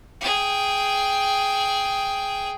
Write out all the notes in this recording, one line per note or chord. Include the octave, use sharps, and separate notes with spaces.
G#4 G5